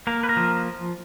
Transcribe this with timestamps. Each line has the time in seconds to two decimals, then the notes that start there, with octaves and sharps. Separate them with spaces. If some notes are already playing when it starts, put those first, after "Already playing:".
0.07 A#3 A#4
0.23 B4
0.29 A#4
0.37 F3